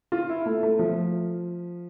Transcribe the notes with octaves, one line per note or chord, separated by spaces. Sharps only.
F4
E4
A3
A3
F3